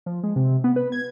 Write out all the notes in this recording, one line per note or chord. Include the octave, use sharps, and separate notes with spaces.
F3
G#3
C3
B3
B4
G#6